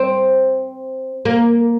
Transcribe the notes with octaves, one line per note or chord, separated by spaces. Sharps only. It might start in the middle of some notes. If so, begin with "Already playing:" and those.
Already playing: C4
A#3